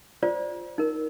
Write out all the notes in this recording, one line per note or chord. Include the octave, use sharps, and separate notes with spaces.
F4 C5 D5
D#4 A#4